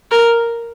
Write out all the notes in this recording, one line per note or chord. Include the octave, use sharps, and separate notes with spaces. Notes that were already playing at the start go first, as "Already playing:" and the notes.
A#4